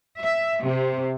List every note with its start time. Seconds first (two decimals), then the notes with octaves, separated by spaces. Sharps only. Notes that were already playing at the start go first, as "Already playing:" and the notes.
0.21 E5
0.63 C3